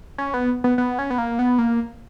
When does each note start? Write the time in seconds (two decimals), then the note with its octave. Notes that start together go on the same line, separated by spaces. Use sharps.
0.18 C#4
0.34 B3
0.64 B3
0.78 B3
0.99 C#4
1.10 B3
1.18 A#3
1.39 B3
1.58 A#3